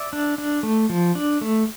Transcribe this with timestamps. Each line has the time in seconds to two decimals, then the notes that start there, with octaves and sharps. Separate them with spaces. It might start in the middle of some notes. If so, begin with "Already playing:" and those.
Already playing: D5 E5
0.13 D4
0.38 D4
0.63 A3
0.90 F3
1.15 D4
1.41 A3